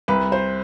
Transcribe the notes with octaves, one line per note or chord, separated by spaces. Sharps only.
C2 B4
C5